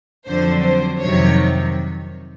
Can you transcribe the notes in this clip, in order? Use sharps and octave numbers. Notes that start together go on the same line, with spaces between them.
F2 D3 F#3 C5
C5
F2 C3 D#3 F#3 C#5